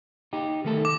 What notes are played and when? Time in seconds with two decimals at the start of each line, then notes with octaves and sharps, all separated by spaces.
0.33 D#4 G4
0.64 D#3 A3 A4
0.85 D6